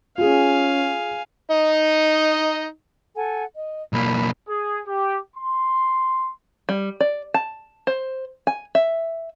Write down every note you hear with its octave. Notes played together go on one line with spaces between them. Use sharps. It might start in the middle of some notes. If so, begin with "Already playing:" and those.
C#4 F4 G#4 F5 G#5
D#4 D#5
A4 F#5 G#5
D#5
B1 A#3 B5
G#4
G4
C6
G3
D5
A5
C5
G#5
E5